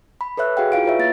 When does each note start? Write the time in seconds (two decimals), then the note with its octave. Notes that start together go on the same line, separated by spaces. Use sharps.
0.21 B5
0.37 A4 B4 C#5 E5 F#6
0.57 F#4 G#4 F5 G5
0.72 E4 F4 F5 D7
0.85 F4 B4 C#5 E5
0.99 A#3 A6